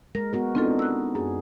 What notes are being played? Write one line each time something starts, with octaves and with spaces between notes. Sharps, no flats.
G#3 A#4 A#6
B3 F#4 A#4
B3 C4 D4 D#4 F4 A4
E6 F#6
F#2 G#4